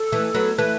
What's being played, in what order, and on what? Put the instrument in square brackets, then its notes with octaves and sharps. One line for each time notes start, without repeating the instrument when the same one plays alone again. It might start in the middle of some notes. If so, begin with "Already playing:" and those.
Already playing: [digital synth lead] A4
[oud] E3 A3
F#3 B3
[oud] E3 A3 [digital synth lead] B4